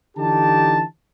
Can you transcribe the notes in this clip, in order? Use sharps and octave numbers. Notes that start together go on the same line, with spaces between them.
D3 E3 D#4 G4 A5